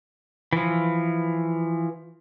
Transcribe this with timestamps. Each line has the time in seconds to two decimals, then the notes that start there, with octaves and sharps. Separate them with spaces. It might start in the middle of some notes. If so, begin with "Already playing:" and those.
0.53 E3 F3